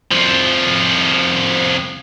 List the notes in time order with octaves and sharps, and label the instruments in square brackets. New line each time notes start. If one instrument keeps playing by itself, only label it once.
[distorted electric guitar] C2 F3